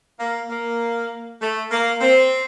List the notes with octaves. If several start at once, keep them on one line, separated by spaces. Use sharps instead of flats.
A#3
A#3
A3
A#3
C4